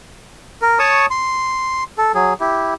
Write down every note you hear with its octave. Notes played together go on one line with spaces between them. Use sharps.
A#4
C#5 A5 C#6 D#6
C6
A4
F#3 G#4
E4 G4